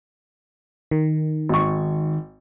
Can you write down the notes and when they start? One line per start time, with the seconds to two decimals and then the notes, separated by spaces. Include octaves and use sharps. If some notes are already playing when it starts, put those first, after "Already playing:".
0.91 D#3
1.49 G#1 C#6